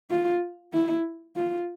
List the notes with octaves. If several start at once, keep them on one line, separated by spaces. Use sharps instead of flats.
F4
E4
F4